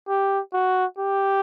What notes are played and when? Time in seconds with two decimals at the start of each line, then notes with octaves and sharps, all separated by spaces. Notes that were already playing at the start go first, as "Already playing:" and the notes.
0.09 G4
0.53 F#4
0.99 G4